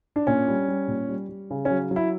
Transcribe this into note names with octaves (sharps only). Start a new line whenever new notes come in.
D4
A#2 C#4
G3
G3
A#2
G3
G3
C#3
C#4
F#3
F#3
E4